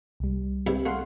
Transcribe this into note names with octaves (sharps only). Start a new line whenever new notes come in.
C2 G3
G2 C3 E4
A3 F5 F#5 C6